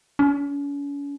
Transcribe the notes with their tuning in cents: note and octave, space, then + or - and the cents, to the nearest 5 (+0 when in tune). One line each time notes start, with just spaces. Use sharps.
C#4 +40